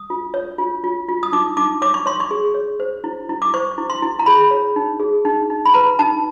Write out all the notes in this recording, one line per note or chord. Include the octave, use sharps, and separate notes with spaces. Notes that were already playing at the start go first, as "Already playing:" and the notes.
Already playing: D#6
F4
C#5
F4
F4
F4
D#6
D#4 D6
D#4 D6
C#5 D6
C#6
C#5 C6
C#6
G#4
C#5
C5
E4
E4
D6
C5 C#6
E4
C6
E4
A#5
G#4 B5
C#5
D#4
G#4
D#4
D#4
B5
B4 A#5
D#4 A5